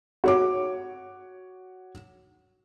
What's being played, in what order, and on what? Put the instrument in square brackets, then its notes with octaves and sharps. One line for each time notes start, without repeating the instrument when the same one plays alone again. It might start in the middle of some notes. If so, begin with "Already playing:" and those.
[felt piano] F#4 C#5 D6